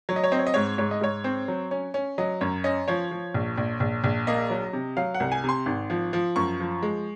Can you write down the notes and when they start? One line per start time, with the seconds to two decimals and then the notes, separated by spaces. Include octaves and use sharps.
0.09 F#3 C#5
0.16 D#5
0.24 C#5
0.32 C4 D#5
0.39 C#5
0.47 D#5
0.54 G#2 C#5
0.78 G#2 C#5
0.91 D#5
1.01 G#2 C#5
1.24 C4
1.48 F#3
1.71 C#4
1.94 C#4
2.18 F#3 D#5
2.41 F#2 C#5
2.64 C#4 D#5
2.88 F3 C#5
3.11 F3
3.34 A#1
3.58 A#1
3.80 A#1
4.04 A#1
4.27 A#3 D#5
4.50 F#3
4.73 C3
4.97 F#3 F5
5.14 F#5
5.20 C2
5.32 G#5
5.44 C3 C6
5.66 G#1
5.90 F3
6.13 F3
6.36 F#2 C#6
6.60 F3
6.83 G#3